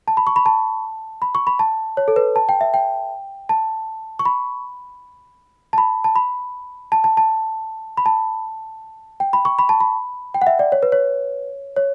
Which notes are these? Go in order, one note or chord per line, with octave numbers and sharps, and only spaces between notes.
A5
B5
C#6
B5
A5
B5
C#6
B5
A5
C#5
A4
B4
A5
G5
E5
G5
A5
C#6
B5
A5
B5
A5
B5
A5
A5
A5
B5
A5
G5
B5
C#6
B5
A5
B5
G5
F#5
E5
D5
C#5
B4
C#5
C#5